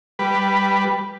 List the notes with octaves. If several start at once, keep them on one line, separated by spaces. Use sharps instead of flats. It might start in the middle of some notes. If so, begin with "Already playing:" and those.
G3 B4